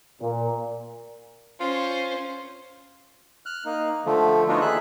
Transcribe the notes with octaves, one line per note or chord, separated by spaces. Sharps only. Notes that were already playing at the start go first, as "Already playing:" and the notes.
A#2
C#4 F4 C5
F6 F#6
A#3 D#4
D3 F3 A3
A3 B3 D4 D#4 F4 F#4
D#3 A#3 G#4 E5 F#6